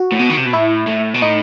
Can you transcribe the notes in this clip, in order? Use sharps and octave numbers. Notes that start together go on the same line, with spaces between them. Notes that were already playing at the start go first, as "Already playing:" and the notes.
Already playing: F#4
A2
B2
D#3
C3
B2
A2 E4
A2
B2
A2 D#4